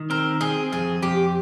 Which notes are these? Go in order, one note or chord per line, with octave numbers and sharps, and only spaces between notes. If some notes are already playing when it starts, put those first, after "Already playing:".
Already playing: D#3
C4 A#4
C4 G#4
F2 G#4
F2 G4